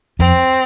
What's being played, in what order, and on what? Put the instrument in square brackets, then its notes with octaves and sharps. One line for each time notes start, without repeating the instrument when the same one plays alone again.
[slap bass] F2 [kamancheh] C4